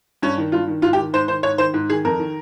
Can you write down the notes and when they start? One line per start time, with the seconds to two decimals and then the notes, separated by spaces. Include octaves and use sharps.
0.22 G2 C#4
0.38 D#3
0.52 G2 F4
0.67 D#3
0.82 G#2 F4
0.93 G4
0.98 D#3
1.13 G#2 C5
1.28 D#3 C5
1.43 G#2 C#5
1.58 D#3 C5
1.74 G#2
1.90 D#3 G#4
2.04 F2 A#4
2.19 D#3